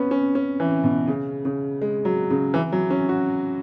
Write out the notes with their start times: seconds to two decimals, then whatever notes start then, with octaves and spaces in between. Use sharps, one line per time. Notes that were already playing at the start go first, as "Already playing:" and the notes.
Already playing: B3 C#4
0.11 C#4
0.35 C#4
0.60 E3
0.84 B2
1.07 C#3
1.45 C#3
1.82 G#3
2.05 F#3
2.30 C#3
2.54 E3
2.72 F#3
2.90 C#4
3.09 F#4